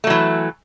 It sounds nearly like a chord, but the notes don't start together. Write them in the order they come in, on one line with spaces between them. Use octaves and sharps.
A3 F#3 E3